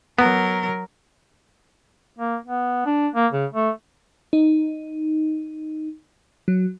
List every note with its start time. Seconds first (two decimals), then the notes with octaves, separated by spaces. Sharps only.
0.19 F#3 B3 A#4
2.19 A#3
2.46 B3
2.86 D4
3.15 A#3
3.32 C#3
3.53 A3
4.33 D#4
6.48 F#3